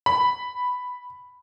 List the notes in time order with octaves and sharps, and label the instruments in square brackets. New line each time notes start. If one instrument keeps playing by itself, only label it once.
[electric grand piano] B5